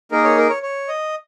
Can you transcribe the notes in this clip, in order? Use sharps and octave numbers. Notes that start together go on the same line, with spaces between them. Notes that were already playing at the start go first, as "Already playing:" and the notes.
A#3 D#4 G#4 A#4
C#5
A#4
C#5
C#5
D#5